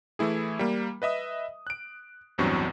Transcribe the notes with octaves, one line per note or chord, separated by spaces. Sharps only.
E3 A3 E4 G#4
G3 A#3
B4 D#5 E5 D#6
F#6 D7
A1 E2 G2 F#3 C4 C#6